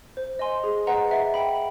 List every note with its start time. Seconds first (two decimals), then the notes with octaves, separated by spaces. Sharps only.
0.17 C5
0.39 D#5 G#5 C6
0.64 G#4
0.87 B4 D#5 F#5 A#5
1.11 E5
1.34 G5 B5